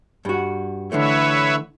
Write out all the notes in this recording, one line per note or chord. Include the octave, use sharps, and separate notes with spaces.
G2 F#4
D3 E3 A3 B4 C#5 E5